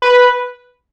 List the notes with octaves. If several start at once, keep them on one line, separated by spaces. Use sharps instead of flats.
B4